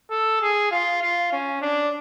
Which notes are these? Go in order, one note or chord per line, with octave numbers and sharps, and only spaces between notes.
A4
G#4
F4
F4
C#4
D4